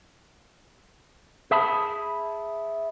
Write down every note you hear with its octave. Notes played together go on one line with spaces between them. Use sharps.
G#4 E5 A5 B5